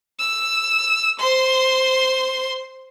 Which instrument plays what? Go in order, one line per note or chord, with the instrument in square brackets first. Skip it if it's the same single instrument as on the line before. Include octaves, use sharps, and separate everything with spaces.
[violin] E6
C5 C6